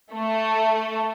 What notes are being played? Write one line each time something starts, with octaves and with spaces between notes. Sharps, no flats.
A3